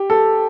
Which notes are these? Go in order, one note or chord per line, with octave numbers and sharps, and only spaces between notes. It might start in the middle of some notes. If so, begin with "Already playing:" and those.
Already playing: G4
A4